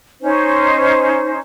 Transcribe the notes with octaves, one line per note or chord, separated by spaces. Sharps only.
C#4 D#4 C5